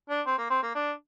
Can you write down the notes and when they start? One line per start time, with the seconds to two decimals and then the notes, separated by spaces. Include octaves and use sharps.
0.10 D4
0.26 C4
0.38 A#3
0.50 C4
0.63 A#3
0.75 D4